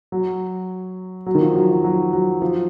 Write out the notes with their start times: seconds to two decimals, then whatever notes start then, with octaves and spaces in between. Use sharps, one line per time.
0.12 F#3
1.26 F#3
1.35 D#3
1.41 F3
1.55 F#3
1.70 F3
1.84 F#3
2.13 F#3
2.42 F3